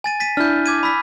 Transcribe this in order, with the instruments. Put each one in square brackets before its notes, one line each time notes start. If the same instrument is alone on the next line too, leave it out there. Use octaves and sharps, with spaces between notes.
[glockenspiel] G#5 A6 D#7
A6 B6 D#7
[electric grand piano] D4 E4 [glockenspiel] F6 G6
[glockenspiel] D6 G#6 D#7
B5 E6 B6